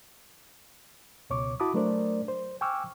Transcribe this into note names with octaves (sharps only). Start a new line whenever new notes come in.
C#2 B2 C#5 C#6 D6
E4 F#4 A5 B5 D6 D#6
F#3 A3 D4 A#4 C5 D5
C5
G5 G#5 C#6 D6 E6 F6